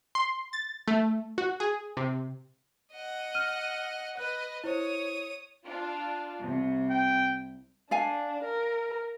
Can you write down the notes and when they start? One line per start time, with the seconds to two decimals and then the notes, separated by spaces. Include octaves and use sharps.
0.15 C6
0.53 A6
0.88 A3
1.38 F#4
1.60 G#4
1.97 C3
2.92 D#5 F#5
3.35 F6 D#7
4.17 B4 D#5 F#6
4.64 E4 C5 C#5 D#6
5.66 D4 F4
6.44 C2 C3
6.91 G5
7.91 D4 A4 F5 G#5
8.44 A#4